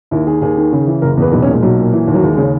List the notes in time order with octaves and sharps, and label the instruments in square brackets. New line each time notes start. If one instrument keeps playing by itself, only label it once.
[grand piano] D#2 E4
D#3 G#4
D#2 G#4
D#3
C#3
E3
F#1 A#4
E2 B4
B1 B4
C#4
A#2
G#3
B1 F#3
A#2
E3
D#2
F#3
D#2 G#3
G#3
C#3
C#4